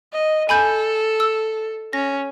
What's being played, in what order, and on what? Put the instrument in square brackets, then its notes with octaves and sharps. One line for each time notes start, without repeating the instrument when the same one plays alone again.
[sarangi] D#5
[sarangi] A4 [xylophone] G#5 B5 G6
[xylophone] E6
[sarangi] C#4 [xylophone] A#6